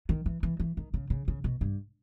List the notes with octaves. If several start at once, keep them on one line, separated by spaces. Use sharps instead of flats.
D#3
E3
E3
E3
D#3
C#3
C#3
C#3
B2
G2